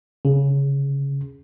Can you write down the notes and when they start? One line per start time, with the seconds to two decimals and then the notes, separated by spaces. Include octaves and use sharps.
0.25 C#3